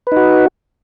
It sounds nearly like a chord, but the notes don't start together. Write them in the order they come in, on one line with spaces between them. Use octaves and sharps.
B4 D#4 F#4